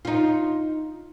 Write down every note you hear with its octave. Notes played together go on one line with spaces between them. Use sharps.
D#4 F4